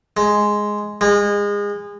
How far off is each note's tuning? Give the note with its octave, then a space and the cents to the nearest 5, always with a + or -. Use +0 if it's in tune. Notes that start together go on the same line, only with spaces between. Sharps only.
G#3 +0
G#3 -30